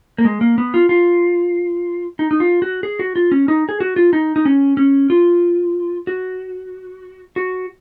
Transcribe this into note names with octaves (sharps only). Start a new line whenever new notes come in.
A#3
G#3
A#3
B3
F4
F4
D#4
D#4
F4
F#4
G#4
F#4
F4
C#4
D#4
G#4
F#4
F4
D#4
D#4
C#4
C#4
F4
F#4
F#4